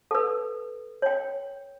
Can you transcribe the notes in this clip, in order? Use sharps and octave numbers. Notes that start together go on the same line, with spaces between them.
A4 B4
C#5 G5